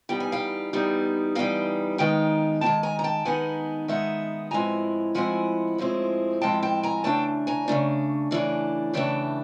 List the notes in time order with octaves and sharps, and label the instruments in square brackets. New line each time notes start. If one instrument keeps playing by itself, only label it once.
[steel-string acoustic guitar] E3 G3 B3 D#4 G5
G#5
F5 G5
E3 G3 B3 D#4
E3 G3 B3 D#4 F5 G5
D#3 G#3 B3 D#4 F5 G5
D#3 G#3 B3 D#4 G5 A5
G#5 A#5
A#5
G5 A5
D#3 G#3 B3 D#4 F#5 G#5
D#3 G#3 B3 D#4 E5 F#5
A2 F3 G#3 C4 E4 G#5 A#5
A2 F3 G#3 C4 E4 F#5 G#5
A2 F3 G#3 C4 E4
A2 F3 G#3 C4 E4 G5 A5
G5 A5
G#5 A#5
C#3 E3 A3 D4 G5 A5
G#5 A#5
C#3 E3 A3 D4
C#3 E3 A3 D4
C#3 E3 A3 D4 G5 A5